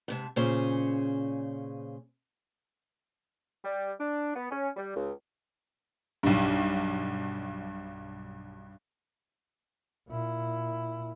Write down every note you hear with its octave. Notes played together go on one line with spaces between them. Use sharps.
G#2 C3 A5
A#2 C#3 C#4 G#4 C5 C#5
G3
D4
B3
C#4
G3
C#2
B1 G2
A#2 E4